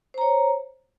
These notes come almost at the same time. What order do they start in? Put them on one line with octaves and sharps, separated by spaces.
C5 A#5 C#5